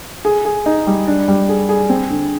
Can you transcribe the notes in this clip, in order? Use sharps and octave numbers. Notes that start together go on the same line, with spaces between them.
G#4
G#4
D#4
G3
D4
G3
G#4
G#4
C4
D3